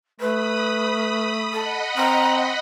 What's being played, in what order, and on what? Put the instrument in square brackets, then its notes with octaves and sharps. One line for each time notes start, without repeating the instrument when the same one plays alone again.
[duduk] A3 [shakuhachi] B4 [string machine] B5 D#6
[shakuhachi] A4 [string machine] D#5 F#5 B5
[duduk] C4 [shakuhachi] A#5